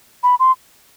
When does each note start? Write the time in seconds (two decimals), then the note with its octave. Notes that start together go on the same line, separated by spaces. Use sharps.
0.23 B5
0.40 C6